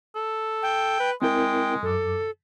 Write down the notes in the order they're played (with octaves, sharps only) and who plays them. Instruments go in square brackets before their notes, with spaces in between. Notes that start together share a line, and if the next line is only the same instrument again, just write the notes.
[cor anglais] A4
[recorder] G5
[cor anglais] B4
[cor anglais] G#3 [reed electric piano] C4 E4 A#4 [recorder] G5
[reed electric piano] F#2 D6 [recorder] A4